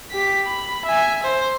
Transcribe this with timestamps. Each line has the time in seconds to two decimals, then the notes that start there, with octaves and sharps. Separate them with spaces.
0.11 G4 B6
0.46 B5
0.85 E5 G#5
1.23 C5